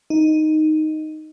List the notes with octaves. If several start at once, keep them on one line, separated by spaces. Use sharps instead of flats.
D#4